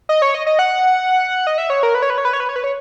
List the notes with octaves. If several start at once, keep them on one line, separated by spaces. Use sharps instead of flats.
D#5
C#5
D#5
D#5
F#5
D#5
E5
C#5
A#4
B4
C#5
B4
C#5
B4
C#5
B4
C#5
B4
C#5